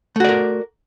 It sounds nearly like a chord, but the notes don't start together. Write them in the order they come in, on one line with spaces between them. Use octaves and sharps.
A3 F#4 D5 A#4